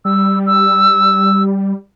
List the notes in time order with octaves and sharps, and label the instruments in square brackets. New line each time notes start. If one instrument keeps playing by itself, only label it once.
[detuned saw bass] G3 [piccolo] E6
[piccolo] E6